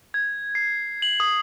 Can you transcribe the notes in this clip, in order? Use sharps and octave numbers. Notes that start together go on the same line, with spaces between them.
G#6
C7
F#7
D#6